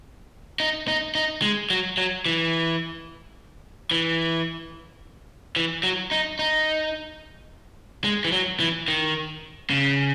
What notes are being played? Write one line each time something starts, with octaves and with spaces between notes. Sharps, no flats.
D#4
D#4
D#4
G#3
F#3
F#3
E3
E3
E3
F#3
D#4
D#4
G#3
E3
F#3
E3
D#3
C#3